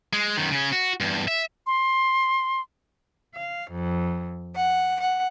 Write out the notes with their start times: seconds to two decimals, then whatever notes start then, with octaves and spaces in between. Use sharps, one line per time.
0.13 G#3
0.37 F#2 D#3
0.51 C#3 C#4
0.72 F#4
1.00 E2 G2
1.28 E5
1.67 C6
3.35 F5
3.71 F2
4.54 F#5
5.00 F#5